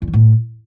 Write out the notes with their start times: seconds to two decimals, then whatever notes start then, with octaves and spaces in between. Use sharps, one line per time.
0.02 E2
0.08 D#3
0.13 A2